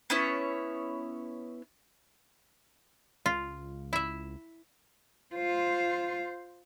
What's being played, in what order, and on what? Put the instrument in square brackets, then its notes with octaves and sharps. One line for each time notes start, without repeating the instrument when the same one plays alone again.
[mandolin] B3 C#4 E4 C#5
[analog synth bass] C#2 [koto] F4
[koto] E4 E5
[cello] F4 C5